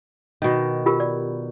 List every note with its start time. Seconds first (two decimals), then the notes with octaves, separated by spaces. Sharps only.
0.42 B2 D#3
0.86 F4 G4 A#4
1.00 D5